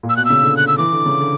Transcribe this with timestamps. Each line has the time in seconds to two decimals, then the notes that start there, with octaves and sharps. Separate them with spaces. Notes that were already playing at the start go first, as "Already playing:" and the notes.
0.03 A#2
0.09 E6
0.17 B2 F#6
0.25 C#3 E6
0.43 D3
0.57 F#6
0.67 E6
0.78 E3 D6
0.92 D3
1.06 C#3
1.20 D3